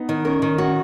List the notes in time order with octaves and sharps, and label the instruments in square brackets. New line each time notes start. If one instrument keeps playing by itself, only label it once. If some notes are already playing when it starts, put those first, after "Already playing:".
Already playing: [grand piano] B3 D#4
[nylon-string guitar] D#3
[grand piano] C#4 [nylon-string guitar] A#4
[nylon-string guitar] D#3
[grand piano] C#4 [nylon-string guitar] F#4